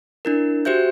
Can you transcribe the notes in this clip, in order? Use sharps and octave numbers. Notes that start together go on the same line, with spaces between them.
D4 E4 A#4
F#4 G4 C5 E5 G6